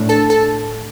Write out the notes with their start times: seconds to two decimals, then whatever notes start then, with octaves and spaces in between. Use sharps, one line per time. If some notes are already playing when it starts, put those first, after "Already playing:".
Already playing: A2 A3 D4
0.09 A4 A5
0.30 A4 A5